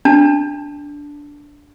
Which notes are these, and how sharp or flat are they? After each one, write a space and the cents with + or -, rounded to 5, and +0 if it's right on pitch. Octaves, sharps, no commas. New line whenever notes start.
D4 -10 A5 +0